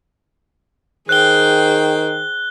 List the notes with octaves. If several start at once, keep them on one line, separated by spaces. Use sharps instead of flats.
D#3 G#4 C5 G5 F#6 G7